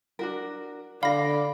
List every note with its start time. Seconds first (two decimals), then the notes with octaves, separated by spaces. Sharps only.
0.19 D4 F#4 A#4
1.03 D3 D5 F5 B5 A#6